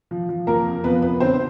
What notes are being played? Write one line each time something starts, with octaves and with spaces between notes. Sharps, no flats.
F3
F3
F3 A#3 A#4
F2
F3 B3 B4
C3 B3 B4
D3 C4 C5